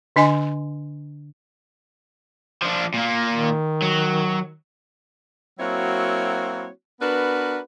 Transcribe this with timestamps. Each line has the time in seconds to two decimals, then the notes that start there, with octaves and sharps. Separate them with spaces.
0.16 D3 D4 D#5 G#5 C6
2.62 F3 D4
2.94 A#2 A#3
3.32 D#3
3.82 F#3
5.59 F#3 A#3 C4 E4 F#4 C#5
7.01 B3 D4 F#4 A#4 B4